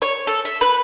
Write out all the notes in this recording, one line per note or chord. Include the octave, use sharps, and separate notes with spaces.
C#5
A4
E5
B4